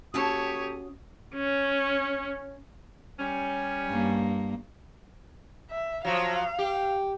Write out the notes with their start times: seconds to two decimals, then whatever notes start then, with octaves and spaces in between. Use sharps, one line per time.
0.14 A#3 C#4 F#4 G4 A4 C#5 A5 D#6
1.35 C#4
3.19 G3 C#4
3.88 G2 A#3
5.71 E5
6.05 F3 F#3 F5
6.58 G4